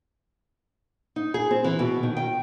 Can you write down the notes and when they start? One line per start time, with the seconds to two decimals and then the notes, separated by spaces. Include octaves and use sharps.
1.16 D#4
1.34 G#4
1.51 C4
1.64 E3
1.79 B2
2.03 D#3
2.17 G5